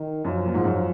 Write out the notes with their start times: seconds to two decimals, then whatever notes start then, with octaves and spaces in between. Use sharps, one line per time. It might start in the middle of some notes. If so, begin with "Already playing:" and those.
Already playing: D#3
0.25 F#2 F3
0.45 A#2
0.54 G#2
0.64 F#2